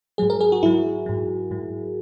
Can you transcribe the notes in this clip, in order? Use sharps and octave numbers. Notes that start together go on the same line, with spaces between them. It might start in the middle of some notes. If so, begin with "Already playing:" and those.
G#2 F#3 G#4
A#4
G#4
F#4
G#2 F#3 E4
G#2 F#3
G#2 F#3